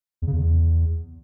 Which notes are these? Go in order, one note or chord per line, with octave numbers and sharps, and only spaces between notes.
E2
C#3
E2